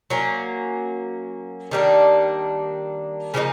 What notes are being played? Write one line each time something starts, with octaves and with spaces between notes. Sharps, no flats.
F#3 A#3 C#4
D#3 G3 A#3 D4
C#3 F3 A#3 D#4